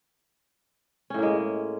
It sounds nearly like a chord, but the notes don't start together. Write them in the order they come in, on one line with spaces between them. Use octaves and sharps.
C#4 A2 A#3 G#3